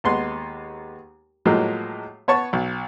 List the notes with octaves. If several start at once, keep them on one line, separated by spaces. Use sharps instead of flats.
D#2 G#3 B3 C6
A2 F3 F#3 G#3 A#3
B3 C#5 A5 C#6
B1